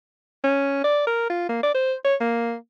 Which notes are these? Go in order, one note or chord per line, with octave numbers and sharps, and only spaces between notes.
C#4
D5
A#4
F4
A#3
D5
C5
C#5
A#3